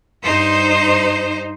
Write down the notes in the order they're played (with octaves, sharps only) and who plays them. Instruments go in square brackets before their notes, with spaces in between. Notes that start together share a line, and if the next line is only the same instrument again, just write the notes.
[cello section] G2 D#4 C5